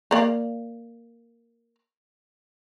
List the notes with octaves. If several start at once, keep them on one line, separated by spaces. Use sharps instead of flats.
A#3 D5 F5